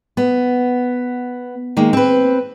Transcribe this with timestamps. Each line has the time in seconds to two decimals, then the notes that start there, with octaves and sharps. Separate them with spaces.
0.17 B3
1.77 D#3 G#3 A#3
1.93 C4 B4